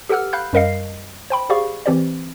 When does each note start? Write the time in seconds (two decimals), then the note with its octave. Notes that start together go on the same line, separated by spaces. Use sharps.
0.09 G4 A4 B4 F#5 E6 F6
0.33 F5 B5 F#6 G6
0.53 F#2 G3 A#4 D#5 F5 C7
1.30 C5 G5 B5
1.50 G4 G#4 C5 D5 F5 C#6
1.86 E3 C4 G4 C5 D5